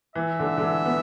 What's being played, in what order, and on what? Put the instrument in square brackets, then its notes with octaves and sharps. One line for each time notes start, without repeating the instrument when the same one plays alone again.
[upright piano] E3 [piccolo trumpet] E5
[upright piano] D3
D3
E3
B3